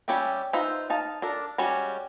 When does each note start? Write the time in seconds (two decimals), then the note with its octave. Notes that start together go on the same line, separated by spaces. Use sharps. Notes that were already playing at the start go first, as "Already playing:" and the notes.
0.08 G3 C#4 G4 E5 G5
0.53 D#4 F4 B4 C5 E5
0.90 D#4 F5 A5
1.22 D4 A4 A#4
1.58 G3 G#3 C#4 F#4